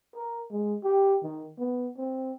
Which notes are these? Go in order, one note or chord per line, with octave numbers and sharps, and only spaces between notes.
A#4
G#3
G4
D#3
B3
C4